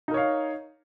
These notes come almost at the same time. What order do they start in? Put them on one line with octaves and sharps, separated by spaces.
D#4 A#4 C#5 F5